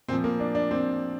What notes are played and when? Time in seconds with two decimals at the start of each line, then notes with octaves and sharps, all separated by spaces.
0.08 A#2 F3 C4
0.24 A#3
0.40 D4
0.55 D4
0.71 C4